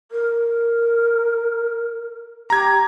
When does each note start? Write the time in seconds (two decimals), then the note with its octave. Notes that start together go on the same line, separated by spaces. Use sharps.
0.11 A#4
2.50 G4 A#5 G#6